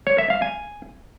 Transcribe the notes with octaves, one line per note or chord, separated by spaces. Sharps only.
C#5
E5
F5
G#5